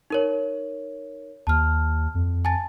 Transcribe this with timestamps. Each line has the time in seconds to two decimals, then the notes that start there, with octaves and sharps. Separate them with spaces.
0.10 D#4 A#4 C#5
1.47 D#2 A5 F6
2.14 F2
2.45 G#5 A5 A6